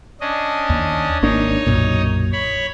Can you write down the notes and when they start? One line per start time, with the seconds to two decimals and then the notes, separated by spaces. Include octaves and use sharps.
0.21 C#4 D4 D#5
0.70 D#2
1.23 G#1 A#3 D4 D#4 C#5 D#5
1.66 B1 F#2 A#2
2.32 C#5 B5